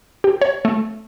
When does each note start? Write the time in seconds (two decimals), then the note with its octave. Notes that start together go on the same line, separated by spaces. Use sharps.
0.24 G4
0.42 C#5
0.65 A3